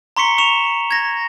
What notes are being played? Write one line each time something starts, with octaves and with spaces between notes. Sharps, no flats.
A#5 C6 C#6 B6 C#7 G7
C#6 E7 F7
G#6 A#6